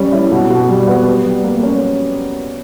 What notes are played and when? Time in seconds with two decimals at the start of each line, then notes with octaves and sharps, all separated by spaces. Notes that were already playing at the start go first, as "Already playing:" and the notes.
Already playing: G3 C#4
0.12 E4
0.31 B2
0.50 B2
0.68 G3
0.87 B3
1.06 G4
1.25 G3
1.44 A#3
1.63 C#4